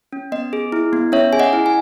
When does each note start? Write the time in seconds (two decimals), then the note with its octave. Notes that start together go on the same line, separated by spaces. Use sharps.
0.13 C#4
0.32 B3 D#5
0.53 G#4
0.72 E4
0.93 B3
1.12 C#4 C#5 E5
1.33 G#4 G#5
1.39 D#5 F#5
1.53 E4
1.66 G#5